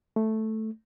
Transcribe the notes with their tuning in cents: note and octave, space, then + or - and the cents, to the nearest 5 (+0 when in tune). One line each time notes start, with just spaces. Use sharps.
A3 -5